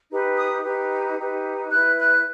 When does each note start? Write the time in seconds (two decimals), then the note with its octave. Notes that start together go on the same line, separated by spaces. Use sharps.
0.09 D#4 G4 B4
0.37 D#6
0.64 D#4 G4 B4
1.18 D#4 G4 B4
1.72 E4 B4 F#6
2.00 F#6